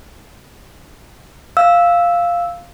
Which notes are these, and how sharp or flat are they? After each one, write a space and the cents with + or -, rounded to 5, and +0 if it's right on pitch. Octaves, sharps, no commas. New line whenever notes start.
F5 -5 E6 -5